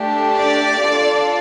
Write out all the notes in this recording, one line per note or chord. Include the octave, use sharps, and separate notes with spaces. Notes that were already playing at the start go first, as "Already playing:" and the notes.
Already playing: A3 D4 G4
D5
D4 F4 A4